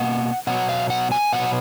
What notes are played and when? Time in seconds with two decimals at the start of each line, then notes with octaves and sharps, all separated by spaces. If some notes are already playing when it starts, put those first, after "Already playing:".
Already playing: B2 A#3 F#5
0.47 B2 F#3 B3 F#5
0.69 F5
0.90 F#5
1.12 G#5
1.32 B2 F#3 B3 F#5